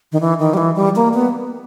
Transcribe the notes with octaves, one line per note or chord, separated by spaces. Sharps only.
D#3
E3
D#3
G3
E3
G3
A#3
B3